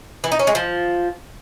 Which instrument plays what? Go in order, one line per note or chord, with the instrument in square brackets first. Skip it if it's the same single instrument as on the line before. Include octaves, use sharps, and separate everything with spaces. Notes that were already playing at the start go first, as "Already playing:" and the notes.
[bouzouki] E3
D#4
C#4
G#3
F3